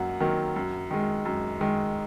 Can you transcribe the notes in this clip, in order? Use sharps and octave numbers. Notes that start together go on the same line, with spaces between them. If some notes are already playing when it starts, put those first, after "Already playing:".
Already playing: F#2 F#3 A#3 F#5
D#3 F#3 A#3
F#2
D#3 G#3
F#2
D#3 G#3